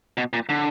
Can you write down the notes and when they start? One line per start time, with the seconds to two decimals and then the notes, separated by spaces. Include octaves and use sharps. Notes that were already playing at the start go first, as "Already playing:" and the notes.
0.17 B2
0.33 A#2
0.49 D3